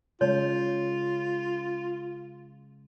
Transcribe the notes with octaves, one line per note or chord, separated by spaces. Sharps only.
C#3 G#3 F4 C#5